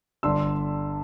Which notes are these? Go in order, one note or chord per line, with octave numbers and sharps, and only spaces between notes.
G1 G2 D3 C6 E6